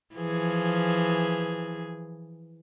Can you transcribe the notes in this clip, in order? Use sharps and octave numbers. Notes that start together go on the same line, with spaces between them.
E3 F3 G#4